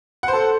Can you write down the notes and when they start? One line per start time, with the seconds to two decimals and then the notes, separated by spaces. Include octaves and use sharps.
0.23 F#5
0.28 C5
0.33 A4